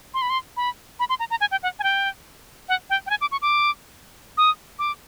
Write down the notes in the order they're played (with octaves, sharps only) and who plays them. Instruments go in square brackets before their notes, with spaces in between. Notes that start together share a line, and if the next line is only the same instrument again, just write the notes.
[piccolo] C6
B5
C6
B5
B5
C6
A#5
A#5
G#5
G5
F#5
G#5
G5
F#5
G5
G5
G#5
D6
C#6
D6
D#6
D6